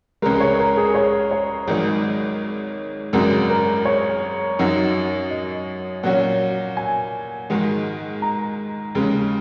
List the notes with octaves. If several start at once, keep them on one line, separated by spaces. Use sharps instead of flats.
C#2 C#3 G#3 A#4
C#5
A#4
G#4
C#5
C#5
G#1 G#2 D#3 F#3 D#4 C#5
G#1 F#2 C#3 G#3 F#4 A#4
A#4
C#5
F#2 F#3 D#4 F#4
D#5
A#2 F#3 C#4 F#4 F#5
G#5
G#2 D#3 G#3 D#4 F#4
A#5
D#2 C#3 G#3